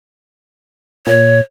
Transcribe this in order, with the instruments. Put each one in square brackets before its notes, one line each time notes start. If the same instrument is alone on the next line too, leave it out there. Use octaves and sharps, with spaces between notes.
[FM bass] A#2 [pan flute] C#5